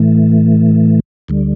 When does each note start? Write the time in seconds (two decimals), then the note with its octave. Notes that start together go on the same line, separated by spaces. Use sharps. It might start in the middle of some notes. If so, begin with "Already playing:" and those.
Already playing: A2 E3 A3
1.28 D2 D3 G3